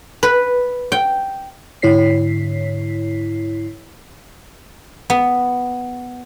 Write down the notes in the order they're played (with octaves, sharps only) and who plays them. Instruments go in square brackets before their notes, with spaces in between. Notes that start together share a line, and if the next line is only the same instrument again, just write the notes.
[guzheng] B4
G5
[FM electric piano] G#2 D3 E4 C#5 B6 C7
[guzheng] B3